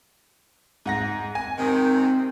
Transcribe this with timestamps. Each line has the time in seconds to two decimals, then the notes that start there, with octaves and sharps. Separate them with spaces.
0.86 G#2 F#5 A#6
1.35 G#5
1.58 G#2 C3 D#3 C4